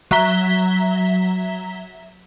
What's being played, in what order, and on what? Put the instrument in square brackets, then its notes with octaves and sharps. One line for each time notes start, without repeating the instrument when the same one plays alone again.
[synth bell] F#3 E5 A#5 B6 G7